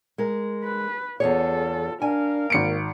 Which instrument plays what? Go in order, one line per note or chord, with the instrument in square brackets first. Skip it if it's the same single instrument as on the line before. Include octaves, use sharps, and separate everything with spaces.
[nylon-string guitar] G#3 A#4
[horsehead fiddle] B4
[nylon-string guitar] E2 G#4 C#5 [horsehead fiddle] F4 A4
[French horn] D4 [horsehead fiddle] A#4 F5 [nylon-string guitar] G#5
[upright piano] G#1 C#7 D7 [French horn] A#3